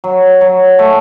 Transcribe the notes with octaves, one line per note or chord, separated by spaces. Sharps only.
F#3
F#3
A3